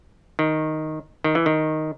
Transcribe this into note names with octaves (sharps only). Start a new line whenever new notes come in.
D#3
D#3
E3
D#3